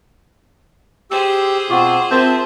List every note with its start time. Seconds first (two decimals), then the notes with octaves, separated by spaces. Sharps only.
1.11 G4 G#4 C5 E6
1.70 B2 C4 F4 F#5 C#6 D6
2.11 C4 F4 A#4 E5 A5 C6 G6